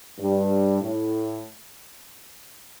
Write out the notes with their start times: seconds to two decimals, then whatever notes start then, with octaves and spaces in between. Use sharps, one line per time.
0.19 G2
0.81 A2